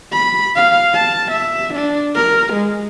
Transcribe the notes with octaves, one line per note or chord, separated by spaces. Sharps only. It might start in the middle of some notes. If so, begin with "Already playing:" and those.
B5
F5
A5
E5
D4
A#4
G#3